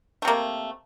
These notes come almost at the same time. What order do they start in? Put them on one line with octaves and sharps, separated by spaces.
A3 C3 A#3